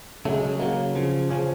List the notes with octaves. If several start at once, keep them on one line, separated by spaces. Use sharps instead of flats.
C#3 F#3 A3
G#3
G#3
A3
C#3 F#3 A#3
C#3 F3
C#3 F3 C#4